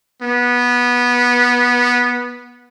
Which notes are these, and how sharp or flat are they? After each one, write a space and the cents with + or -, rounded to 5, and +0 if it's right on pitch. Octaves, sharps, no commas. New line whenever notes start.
B3 -15